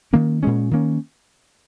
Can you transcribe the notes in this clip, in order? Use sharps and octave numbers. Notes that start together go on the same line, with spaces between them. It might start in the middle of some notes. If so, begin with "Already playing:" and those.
D#3 A#3 C#4
A#2 G#3 C#4
D#3 A#3 C#4